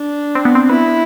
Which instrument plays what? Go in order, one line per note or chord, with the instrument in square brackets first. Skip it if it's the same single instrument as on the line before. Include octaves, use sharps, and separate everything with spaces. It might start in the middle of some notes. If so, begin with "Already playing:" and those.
Already playing: [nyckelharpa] D4
[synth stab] C4
B3
C4
[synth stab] B3 [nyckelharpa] E4